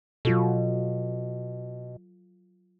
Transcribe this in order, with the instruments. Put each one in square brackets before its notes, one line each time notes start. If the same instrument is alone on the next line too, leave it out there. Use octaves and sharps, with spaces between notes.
[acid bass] B2 [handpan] F#3 F4 A4